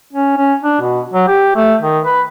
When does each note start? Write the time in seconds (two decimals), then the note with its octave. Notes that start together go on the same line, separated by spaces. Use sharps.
0.13 C#4
0.37 C#4
0.63 D4
0.80 B2
1.13 F#3
1.28 G4
1.56 A3
1.82 D#3
2.04 B4